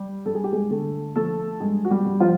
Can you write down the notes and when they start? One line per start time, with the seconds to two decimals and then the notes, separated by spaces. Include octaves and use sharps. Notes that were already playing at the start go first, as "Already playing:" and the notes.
Already playing: G3 G4
0.26 G2 A4
0.35 G#4
0.44 G4
0.53 G#3 G#4
0.70 D3 A3 A4
1.16 F3 A3 A4
1.60 G2 G#3 G#4
1.85 F#4
1.90 G3 G4
2.06 G2
2.20 F3 F4